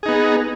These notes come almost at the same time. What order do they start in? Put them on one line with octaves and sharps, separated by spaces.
G#4 D#4 B3